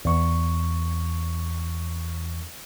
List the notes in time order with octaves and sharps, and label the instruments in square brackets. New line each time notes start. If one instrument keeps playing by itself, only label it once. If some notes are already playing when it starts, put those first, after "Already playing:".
[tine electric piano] E2 C#6